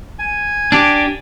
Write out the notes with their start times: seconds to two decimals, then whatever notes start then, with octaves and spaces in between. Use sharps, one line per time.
0.19 G#5
0.72 D4 G4